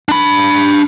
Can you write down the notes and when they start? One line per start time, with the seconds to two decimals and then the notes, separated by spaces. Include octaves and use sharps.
0.08 D4 B5